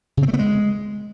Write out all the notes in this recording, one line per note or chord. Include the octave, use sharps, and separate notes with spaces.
C#3
C4
A3
B3
G#3